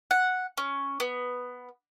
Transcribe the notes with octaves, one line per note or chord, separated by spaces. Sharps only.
F#5
C#4
B3